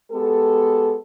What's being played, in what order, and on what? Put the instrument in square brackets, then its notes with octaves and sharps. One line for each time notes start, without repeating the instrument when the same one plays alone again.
[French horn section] G#3 B3 G4 A4